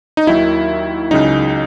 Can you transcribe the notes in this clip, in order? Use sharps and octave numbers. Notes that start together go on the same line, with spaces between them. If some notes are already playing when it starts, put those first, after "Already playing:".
D#4
D#2 D#3 F#3 E4
C#2 C#3 F#3 D#4